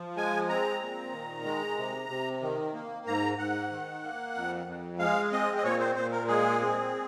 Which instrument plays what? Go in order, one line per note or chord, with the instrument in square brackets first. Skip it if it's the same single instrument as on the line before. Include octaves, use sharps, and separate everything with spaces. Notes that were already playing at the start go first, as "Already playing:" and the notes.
Already playing: [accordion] F3
G#3 G#5
C4 A#5
A#2
D#3
G#3
C3
C3
D#3
A#3
G#2 A#5
G#2 F#5
D#3
A#3
F2
F2
G#3 F5
C4 D#5
D#5
A#2 C#5
C5
A#2 C5
A#4
G#3 G#4
C4